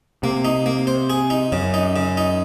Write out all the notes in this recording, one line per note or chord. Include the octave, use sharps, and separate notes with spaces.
C3 A#3
D#4
A#3
C5
G#4
D#4
F#2 C#3
D#4
C#3
D#4